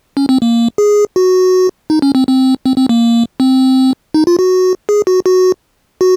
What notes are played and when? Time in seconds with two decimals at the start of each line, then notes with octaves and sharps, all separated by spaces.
0.17 C#4
0.29 C4
0.42 A#3
0.78 G#4
1.16 F#4
1.90 D#4
2.02 C#4
2.15 C4
2.28 C4
2.66 C4
2.77 C4
2.89 A#3
3.40 C4
4.14 D#4
4.27 F4
4.39 F#4
4.89 G#4
5.07 F#4
5.26 F#4
6.01 F#4